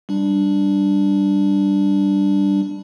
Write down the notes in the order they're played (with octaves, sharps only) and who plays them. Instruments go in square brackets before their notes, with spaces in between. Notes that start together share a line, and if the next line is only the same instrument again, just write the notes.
[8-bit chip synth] G3 D4